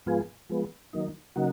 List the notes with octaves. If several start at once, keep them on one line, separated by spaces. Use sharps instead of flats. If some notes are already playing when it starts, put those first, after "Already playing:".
G#2 F3 B3 F4 G#4
F3 G#3 B3
D#3 F#3 A#3 D#4
C#3 F#3 A#3 D#4 F#4